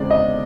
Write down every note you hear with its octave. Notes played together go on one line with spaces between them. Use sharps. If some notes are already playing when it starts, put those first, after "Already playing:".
Already playing: E2 C#3 G#3 C4 D5
D#5